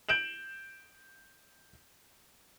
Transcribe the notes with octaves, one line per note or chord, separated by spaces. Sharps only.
G6 D7 E7 F#7